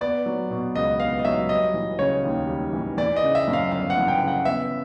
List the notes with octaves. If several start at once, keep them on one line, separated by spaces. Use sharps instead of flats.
B3 D5
F#3
B2
C#2 D#5
B3 F5
D#5
F#3 E5
G3 D#5
E3
C#3 C#5
D#2
G3
E3
E3 D5
D#5
C#3
E5
F#2
F5
G1 F5
F#5
E3
G5
C#3
F#5
B3 E5